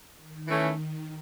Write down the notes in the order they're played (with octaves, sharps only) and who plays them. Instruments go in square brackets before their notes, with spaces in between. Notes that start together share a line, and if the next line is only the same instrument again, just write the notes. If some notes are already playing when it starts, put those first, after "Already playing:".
[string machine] D#3
[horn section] E3 A3 C#4